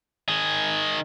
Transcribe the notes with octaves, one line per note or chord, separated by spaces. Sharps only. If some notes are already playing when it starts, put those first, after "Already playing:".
D#3 G#4